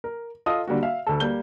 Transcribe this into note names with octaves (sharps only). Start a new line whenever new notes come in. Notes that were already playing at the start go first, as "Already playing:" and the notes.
A#4
F4 A4 D#5 D#6
D3 G3 A#3 F#4
E5 F5
D2 A4
G3 A#3 G6 G7